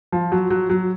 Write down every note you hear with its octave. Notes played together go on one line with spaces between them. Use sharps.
F3
F#3
F#3
F#3